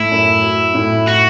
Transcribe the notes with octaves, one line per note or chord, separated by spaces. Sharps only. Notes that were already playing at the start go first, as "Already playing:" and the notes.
Already playing: A2 A3 E4
F#2
F#3
A2
F#4